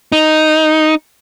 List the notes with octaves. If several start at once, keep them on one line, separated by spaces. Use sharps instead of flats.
D#4